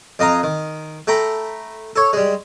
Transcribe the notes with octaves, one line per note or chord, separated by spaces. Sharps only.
F2 D#5 F5 A#5
D#3
A3 A4 G5 A#5 B5
A4 C#5
G3 G#3